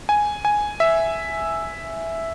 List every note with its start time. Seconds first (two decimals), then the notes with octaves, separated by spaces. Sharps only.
0.09 G#5
0.45 G#5
0.80 E5